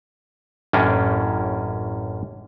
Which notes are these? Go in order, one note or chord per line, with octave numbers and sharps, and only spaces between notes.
A1 F#2 A2 A#3 C#4 D4